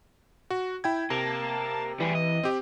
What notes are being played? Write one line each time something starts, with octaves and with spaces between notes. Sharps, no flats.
F#4
E4 G5 G#6
C3 A#3 A5
E3 G3 G#4
D#5
C4 G4